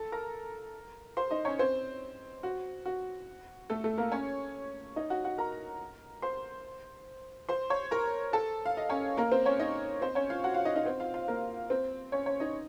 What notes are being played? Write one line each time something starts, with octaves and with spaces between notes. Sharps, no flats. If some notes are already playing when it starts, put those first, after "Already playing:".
Already playing: A4 A5
A#4 A#5
C5 C6
D#4 D#5
C#4 C#5
C4 C5
F#4
F#4
A3 A4
A3 A4
A#3 A#4
C#4 C#5
D#4 D#5
F#4 F#5
F#4 F#5
A#4 A#5
C5 C6
C5 C6
C#5 C#6
A#4 A#5
A4 A5
F5
D#5
C#4 C#5
A#3 A#4
C4 C5
C#4 C#5
D#4 D#5
C4 C5
C#4 C#5
F4 F5
F#4 F#5
F4 F5
D#4 D#5
D#4 D#5
C4 C5
F4 F5
F4 F5
A#3 A#4
C4 C5
C#4 C#5
C#4 C#5
D#4 D#5